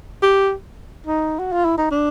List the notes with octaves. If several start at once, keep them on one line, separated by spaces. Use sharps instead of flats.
G4
D#4
F#4
F4
E4
D#4
D4